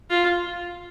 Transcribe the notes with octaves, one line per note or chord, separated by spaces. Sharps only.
F4